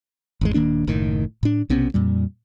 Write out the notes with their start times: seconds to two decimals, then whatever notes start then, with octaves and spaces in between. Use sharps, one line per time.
0.41 G#1 E2 G#3
0.54 D#1 D#3 A#3 D4
0.87 F#1 A2 D#3
1.43 A2 D4
1.70 B1 C3 B3 C#4
1.94 F2 A#2 G3